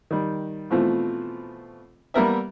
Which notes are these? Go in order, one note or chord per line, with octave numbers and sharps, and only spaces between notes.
D#3 G3
B2 E3 F3 A3 C4 F4
G3 A#3 B3 A#4 B4 E5